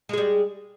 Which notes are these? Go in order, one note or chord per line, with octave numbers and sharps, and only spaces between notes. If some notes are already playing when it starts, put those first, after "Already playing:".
G3 G#3 G#4